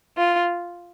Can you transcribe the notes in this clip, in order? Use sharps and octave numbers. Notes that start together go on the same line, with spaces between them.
F4